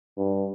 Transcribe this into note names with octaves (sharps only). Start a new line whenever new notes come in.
G2